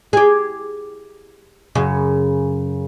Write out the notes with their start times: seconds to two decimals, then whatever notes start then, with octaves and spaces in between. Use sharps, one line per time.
0.13 G4 G#4
1.75 F#2 C#3